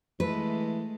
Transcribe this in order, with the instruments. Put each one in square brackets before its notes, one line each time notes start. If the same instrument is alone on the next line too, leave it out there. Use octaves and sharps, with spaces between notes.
[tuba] E3 [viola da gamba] G#3 A3 [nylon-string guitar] B4